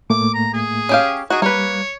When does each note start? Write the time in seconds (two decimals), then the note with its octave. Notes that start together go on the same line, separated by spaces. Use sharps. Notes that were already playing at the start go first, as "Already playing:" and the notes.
0.10 A2 A3 A#3 D6
0.34 A#5
0.53 G#4
0.89 C#4 G4 F5
1.30 D#3 F#4 G#4
1.42 G3 A#3 B4 C#5